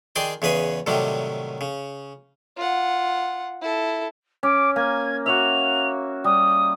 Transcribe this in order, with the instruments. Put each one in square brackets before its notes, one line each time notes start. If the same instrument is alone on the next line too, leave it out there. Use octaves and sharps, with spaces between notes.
[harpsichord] D#3 G#4 D5 G5 C6
E2 C#3 G#4 B4 G#5
A2 C3 D#3 F#3 G3
C#3
[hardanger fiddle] F4 F#5
E4 A4
[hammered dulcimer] C#4 [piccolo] D6
[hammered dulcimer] A#3 G#5 [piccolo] G#6
[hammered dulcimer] F#4 C#5 E5 [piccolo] F7
[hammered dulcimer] G3 [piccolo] D#6